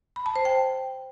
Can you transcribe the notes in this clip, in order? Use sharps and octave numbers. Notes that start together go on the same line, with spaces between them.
B5
A5
C5
G5